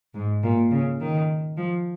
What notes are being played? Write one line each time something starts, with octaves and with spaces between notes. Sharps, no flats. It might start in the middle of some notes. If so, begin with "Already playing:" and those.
G#2
A#2
C#3
D#3
F3